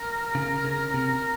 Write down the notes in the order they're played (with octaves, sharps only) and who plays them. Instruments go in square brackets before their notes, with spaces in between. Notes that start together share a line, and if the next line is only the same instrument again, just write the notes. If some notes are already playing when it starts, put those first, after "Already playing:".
Already playing: [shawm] A#4
[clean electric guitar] C#3
C#3
C3